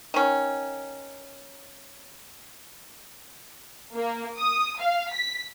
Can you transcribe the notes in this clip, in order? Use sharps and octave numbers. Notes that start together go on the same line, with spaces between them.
D#3 C#4
A#3
D#6
F5
B6